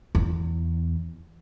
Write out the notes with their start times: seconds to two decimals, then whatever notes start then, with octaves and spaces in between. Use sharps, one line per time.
0.15 E2